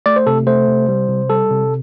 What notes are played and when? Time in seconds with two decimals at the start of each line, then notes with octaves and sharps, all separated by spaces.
0.06 A3 D5
0.16 C5
0.27 C3 A4
0.47 A3 C5
0.68 C3
0.89 G3
1.09 C3
1.30 G3 A4
1.51 C3